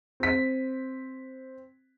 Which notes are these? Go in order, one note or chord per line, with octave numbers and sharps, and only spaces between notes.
C4 B6